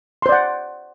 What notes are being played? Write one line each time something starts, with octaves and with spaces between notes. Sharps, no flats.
C5 D5 F#5 C6